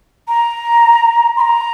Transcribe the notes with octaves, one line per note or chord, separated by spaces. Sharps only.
A#5
C6
A#5